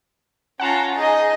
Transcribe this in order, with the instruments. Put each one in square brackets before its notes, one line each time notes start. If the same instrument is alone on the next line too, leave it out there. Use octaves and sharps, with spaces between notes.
[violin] C#4 F4 [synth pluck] F#5 A5 A#5
[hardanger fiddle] D#4 D#5 [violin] G#4